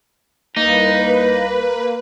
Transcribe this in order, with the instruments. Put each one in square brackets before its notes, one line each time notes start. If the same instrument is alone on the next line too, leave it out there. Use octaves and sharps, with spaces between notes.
[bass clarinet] C2 [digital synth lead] A#3 [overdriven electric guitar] D#4 [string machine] B4